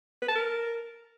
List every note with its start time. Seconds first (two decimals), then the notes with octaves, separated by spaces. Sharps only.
0.22 B4
0.29 A5
0.35 A#4